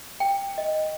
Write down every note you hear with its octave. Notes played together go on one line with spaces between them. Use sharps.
G5
D#5